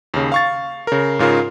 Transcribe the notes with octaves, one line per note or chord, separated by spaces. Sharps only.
D#2 C#3
F5 C#6 A6
C#3 A#4
G#2 C#3 F4 A#4